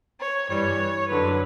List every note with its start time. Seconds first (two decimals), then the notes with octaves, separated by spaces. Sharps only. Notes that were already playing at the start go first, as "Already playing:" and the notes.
0.19 C#5
0.49 G2 E3 G3 C#5
1.09 F#2 D3 F#3 B4